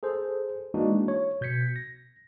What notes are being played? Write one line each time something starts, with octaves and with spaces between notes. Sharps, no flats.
G#4 A4 C5
E3 G#3 A#3 D4 D#4 F#4
C#5
B2 G6 G#6 B6 C#7
A#6